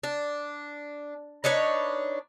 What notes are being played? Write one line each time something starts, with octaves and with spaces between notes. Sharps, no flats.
D4
D4 D#4 B4 C#5